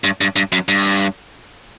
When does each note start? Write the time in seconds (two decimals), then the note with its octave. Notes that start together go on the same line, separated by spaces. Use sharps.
0.04 G2
0.21 G2
0.36 G2
0.52 F#2
0.68 G2